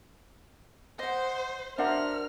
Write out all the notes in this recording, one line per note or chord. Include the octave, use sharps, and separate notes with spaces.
C5 D#5 F#5
D4 F#4 A#4 C5 E5 F#5 F6